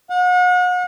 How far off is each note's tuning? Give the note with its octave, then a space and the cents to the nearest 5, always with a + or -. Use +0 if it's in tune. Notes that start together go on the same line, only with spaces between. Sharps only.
F#5 -40